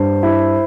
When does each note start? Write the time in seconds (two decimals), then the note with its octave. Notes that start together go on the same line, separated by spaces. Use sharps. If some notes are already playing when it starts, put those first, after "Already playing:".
Already playing: G2 C5
0.23 E4